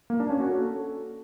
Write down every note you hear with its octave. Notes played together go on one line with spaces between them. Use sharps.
A#3
D4
C#4
F#4
A4